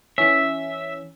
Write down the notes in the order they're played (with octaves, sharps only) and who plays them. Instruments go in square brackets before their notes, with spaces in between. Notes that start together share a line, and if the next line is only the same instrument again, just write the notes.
[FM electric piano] E3 C#4 [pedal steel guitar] E5